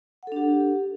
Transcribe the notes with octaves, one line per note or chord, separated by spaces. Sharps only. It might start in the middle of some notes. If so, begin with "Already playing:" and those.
D4 G4 A4 F#5